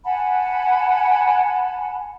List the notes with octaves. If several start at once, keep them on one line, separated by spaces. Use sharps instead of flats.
F#5 G#5 A5 B5